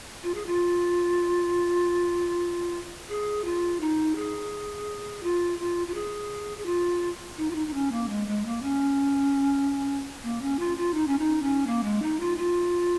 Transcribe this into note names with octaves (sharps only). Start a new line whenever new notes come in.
F4
G#4
F4
G#4
F4
D#4
G#4
F4
F4
F4
G#4
G#4
F4
D#4
F4
D#4
D#4
C#4
A#3
G#3
G#3
A#3
C#4
A#3
C#4
F4
F4
D#4
C#4
D#4
C#4
A#3
G#3
D#4
F4
F4